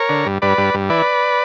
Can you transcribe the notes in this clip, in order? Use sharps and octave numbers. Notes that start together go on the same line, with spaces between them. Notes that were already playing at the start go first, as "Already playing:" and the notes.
Already playing: A#4 C#5
D3
G2
G2 B4 D5
G2
G2
E3 B4 D5